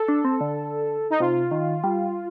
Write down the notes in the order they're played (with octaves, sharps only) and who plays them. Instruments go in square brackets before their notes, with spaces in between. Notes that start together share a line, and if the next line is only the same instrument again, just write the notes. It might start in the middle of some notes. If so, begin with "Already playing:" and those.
Already playing: [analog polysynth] A4
[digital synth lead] D4
C4
D3
[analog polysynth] D#4
[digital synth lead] C3 [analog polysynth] F4
[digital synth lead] D#3
G3